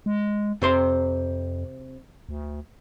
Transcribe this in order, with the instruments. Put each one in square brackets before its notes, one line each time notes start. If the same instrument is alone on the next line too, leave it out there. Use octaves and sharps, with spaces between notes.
[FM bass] G#3
[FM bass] F2 [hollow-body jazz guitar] C3 C5 C6
[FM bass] D2